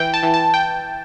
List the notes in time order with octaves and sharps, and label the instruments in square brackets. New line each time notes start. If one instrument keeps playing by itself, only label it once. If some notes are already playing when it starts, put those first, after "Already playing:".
Already playing: [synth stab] E3 G5
A5
E3
A5
G5